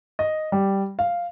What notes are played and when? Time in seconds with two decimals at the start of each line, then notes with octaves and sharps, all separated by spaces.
0.19 D#5
0.52 G3
0.99 F5